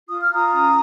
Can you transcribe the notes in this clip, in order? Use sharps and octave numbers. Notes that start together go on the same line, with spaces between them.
F4 D#6
F6
F4 A#5 D#6
C#4